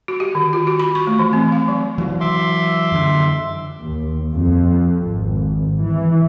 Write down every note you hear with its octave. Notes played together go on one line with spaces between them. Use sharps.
F#4
G4
D#3
F4
F#4
B5
C#6
A3
E3
C4
F5
F#3
E3 F#3
E5 C6 D6
F#2 D3
D#2
F2
G#1
E3